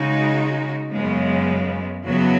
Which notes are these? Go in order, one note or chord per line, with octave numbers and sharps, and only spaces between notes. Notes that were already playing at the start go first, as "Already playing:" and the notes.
Already playing: C#3 G#3 D#4 F#4
F#2 C#3 G#3 B3
E2 C#3 F#3 B3 F#4